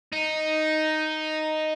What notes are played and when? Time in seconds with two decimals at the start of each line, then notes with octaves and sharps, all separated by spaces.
0.12 D#4